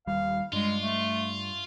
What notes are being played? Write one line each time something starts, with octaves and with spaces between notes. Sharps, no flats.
D#1 D#2 G3 F5
G2 G3 G#3 F4
A3